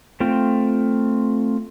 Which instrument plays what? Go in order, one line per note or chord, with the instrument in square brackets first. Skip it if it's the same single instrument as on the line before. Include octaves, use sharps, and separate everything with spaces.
[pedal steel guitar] A3 C4 F4 G5